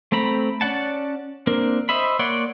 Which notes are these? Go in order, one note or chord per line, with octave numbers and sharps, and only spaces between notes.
A3 C4 A#5 B5
C#4 D5 F#5 A5
A#3 C4 D4 A#4
C5 D#5 E5 B5
A#3 C#5 D5 F#5 C6